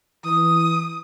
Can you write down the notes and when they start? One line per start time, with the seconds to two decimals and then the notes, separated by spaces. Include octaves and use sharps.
0.24 E3 D#6